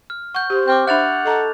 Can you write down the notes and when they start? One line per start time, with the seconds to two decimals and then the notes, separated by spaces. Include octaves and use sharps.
0.10 F6
0.35 F#5 C#6 G6
0.50 G4 C5
0.68 C4 D6 F6 G6
0.87 D4 E5 F#5 F#6 A6 F7
1.25 A4 D#5 A#5